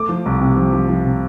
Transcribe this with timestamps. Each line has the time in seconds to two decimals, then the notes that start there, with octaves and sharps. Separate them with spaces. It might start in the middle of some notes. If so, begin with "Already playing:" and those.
Already playing: A3 D6
0.09 F3
0.26 C2
0.41 C3
0.57 F3
0.73 F3
0.89 F3
1.05 C3